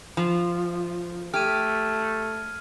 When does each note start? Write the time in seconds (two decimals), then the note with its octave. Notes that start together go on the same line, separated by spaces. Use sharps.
0.17 F3
1.34 A3 G4 F6 G#6 D#7